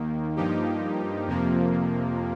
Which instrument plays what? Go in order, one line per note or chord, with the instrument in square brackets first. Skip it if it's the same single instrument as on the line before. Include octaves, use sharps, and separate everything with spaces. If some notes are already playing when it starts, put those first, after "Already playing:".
Already playing: [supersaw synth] D#2 D#3 A#3
G2 F3 A#3 D#4 G4
F2 C3 F3 A#3